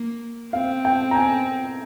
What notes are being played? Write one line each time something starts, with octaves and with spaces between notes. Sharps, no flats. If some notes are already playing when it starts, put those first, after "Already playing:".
Already playing: A#3
C4 F5
G5
A#5
G#5